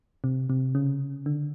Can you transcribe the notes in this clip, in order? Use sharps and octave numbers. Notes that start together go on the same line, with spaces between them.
C3
C3
C#3
D3